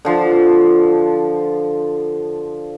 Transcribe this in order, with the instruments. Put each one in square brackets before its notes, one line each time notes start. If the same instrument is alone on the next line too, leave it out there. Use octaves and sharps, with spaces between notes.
[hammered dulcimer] D3 F3